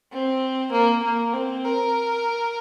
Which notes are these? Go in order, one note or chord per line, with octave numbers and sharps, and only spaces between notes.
C4
A#3
A#3
C4
A#4